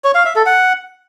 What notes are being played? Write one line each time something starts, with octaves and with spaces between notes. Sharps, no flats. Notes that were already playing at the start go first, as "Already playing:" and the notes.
C#5
F5
E5
A4
F#5